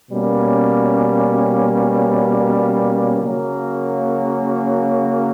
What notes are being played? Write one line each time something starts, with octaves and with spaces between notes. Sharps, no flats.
B2 G3 A#3 C#4
C#3 F#3 A#3